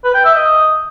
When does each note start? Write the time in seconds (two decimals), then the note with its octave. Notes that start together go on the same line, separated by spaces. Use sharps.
0.04 B4
0.14 G5
0.25 E5
0.35 D#5